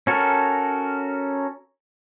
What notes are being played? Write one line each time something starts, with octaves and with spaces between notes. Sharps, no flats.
C#4 F#4 A4 A#4